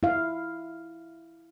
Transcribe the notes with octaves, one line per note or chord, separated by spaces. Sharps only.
E4 F5